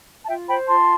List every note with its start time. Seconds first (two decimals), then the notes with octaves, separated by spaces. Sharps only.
0.23 A5
0.28 F4 E5 G5
0.48 C5 G5 B5
0.68 F4 A5 C6